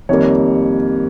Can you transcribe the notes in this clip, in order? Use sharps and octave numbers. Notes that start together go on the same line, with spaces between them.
F2 D#3 G3 A#3 C#5